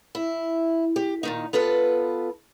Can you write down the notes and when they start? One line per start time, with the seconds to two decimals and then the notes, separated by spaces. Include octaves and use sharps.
0.15 E4
0.96 G4
1.23 A#2 D#3 D#4
1.53 B3 F4 A4 B4